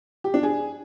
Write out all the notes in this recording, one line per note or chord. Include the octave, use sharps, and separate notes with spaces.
G4
D4
G#4